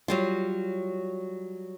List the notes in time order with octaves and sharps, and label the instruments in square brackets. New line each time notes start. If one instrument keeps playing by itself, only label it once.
[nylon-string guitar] F#3 G3 F4